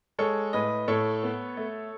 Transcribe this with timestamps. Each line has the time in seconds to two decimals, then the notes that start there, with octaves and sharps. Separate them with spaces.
0.19 G#3 A4 C#5
0.53 A2 B4 D#5
0.88 A2 A4 C#5
1.23 B3
1.57 A3